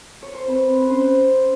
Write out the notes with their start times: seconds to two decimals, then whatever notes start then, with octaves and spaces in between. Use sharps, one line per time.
0.22 C#5
0.35 C5
0.48 C4 B4
0.82 B4
0.90 C#4 C5